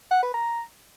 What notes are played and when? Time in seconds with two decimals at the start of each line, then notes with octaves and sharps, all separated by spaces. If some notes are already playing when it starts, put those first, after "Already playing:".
0.11 F#5
0.22 B4
0.34 A#5